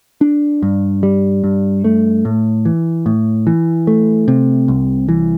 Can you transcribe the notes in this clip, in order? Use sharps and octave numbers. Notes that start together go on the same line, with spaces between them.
D4
G2
G3
G2
A3
A2
E3
A2
E3
A3
C3
C2
E3